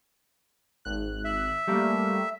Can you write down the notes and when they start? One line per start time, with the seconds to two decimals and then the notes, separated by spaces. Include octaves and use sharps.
0.85 G#1 F#6
1.25 E5
1.67 G3 A3 A#3